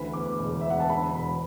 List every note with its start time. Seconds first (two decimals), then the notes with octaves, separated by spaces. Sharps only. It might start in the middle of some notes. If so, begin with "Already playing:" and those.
Already playing: D2 E3 B5
0.13 E2 D6
0.39 E1
0.61 E3 E5
0.70 F#5
0.80 A5
0.89 D3 B5
1.15 E1 B5